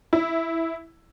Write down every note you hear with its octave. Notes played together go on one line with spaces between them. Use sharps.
E4